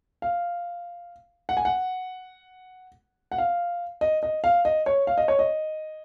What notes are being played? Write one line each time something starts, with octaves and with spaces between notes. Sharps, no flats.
F5
F#5
G#5
F#5
F#5
F5
D#5
D#5
F5
D#5
C#5
F5
D#5
C#5
D#5